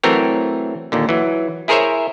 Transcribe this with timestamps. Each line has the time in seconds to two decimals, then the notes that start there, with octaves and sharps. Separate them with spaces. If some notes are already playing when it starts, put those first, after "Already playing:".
0.04 E3 F#3 A3 C4 A#4 C#5
0.92 D#2 A#2 D3
1.09 E3 F#3
1.68 E4 G#4 A#4 C5 C#5 E5